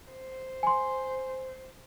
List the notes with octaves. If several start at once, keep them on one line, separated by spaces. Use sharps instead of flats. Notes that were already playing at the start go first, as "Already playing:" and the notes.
C5
G#5 C6